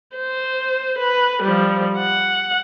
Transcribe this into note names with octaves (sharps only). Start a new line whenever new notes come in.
C5
B4
F3 G3
F#5